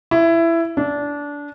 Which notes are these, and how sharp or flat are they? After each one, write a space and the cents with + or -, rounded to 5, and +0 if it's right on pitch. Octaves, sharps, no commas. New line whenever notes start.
E4 +15
D4 -20